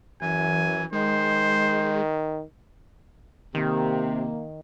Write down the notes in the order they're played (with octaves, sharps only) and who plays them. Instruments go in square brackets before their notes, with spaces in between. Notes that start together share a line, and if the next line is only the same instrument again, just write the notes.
[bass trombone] F#2 [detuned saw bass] E3 [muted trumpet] G#5
[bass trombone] D#3 [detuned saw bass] G#3 [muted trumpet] C5
[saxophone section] C3 [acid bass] D#3 [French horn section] A#3